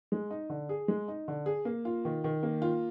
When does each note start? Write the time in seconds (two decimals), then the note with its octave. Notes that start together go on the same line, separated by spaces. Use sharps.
0.12 G#3
0.31 D#4
0.50 D3
0.69 G#4
0.88 G#3
1.08 D#4
1.28 D3
1.46 G#4
1.65 A#3
1.85 F4
2.05 D#3
2.24 D#3
2.43 A#3
2.62 F4